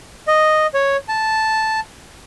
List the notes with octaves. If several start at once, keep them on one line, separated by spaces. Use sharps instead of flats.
D#5
C#5
A5